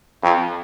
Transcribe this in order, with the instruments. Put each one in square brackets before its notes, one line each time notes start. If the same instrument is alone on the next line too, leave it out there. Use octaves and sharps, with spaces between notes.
[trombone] F2